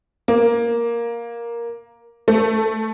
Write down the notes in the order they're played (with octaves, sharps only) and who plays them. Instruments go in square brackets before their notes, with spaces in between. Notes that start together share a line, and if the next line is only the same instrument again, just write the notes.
[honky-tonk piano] A#3
A3